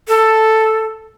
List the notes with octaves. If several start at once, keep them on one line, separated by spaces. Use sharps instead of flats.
A4